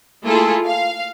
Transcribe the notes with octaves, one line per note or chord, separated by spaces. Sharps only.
A3 A#3 E4 F4 G#4 A4
F5